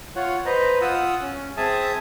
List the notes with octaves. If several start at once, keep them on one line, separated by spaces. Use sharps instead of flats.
F4 C#5 F#5
B4 C5 D#5 A#5
F4 F#5 D#6 E6
C#4
C4 G#4 E5 A5 D#6